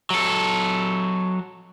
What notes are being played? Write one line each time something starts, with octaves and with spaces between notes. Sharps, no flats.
F#3 A4